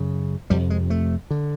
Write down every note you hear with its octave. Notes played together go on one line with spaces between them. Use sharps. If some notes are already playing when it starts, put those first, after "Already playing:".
Already playing: F#2 C#3
F2 C3 G3
G#3
A3
D3